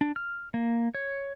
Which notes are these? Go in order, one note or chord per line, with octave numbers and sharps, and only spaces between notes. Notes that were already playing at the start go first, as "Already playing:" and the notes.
D4
F6
A#3
C#5